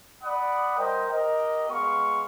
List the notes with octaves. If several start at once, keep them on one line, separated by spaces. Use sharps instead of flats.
D5 F#5 B5 D#6
G3 A#4 C5 D#5 G5
G4 A#4 D#5
G#3 B3 F5 C#6